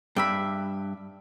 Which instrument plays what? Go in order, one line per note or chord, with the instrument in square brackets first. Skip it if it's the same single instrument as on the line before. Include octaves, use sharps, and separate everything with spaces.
[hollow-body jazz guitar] G2 [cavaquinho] D5 E5 B5